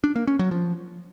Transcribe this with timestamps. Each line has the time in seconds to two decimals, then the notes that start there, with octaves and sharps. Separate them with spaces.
0.04 D4
0.16 A#3
0.27 C#4
0.39 F#3
0.51 F3